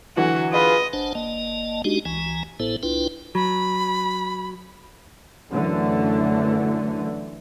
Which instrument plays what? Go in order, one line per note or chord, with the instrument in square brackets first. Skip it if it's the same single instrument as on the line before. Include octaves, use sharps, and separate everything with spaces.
[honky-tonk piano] D3 E3 F#3 [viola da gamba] F#4
[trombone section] F4 G#4 B4 [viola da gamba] D#5
[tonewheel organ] G#1 D4 C5 F#5 A5
G1 A#3 D#5 A5
G#3 D4 D#4 F#4 G4
C#2 E3 G#5 A#5
A1 A2 B3 E4 A4 C5
C2 D4 E4 F4 B4 G5
[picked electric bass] F#3 [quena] B5
[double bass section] F#2 D3 E3 A3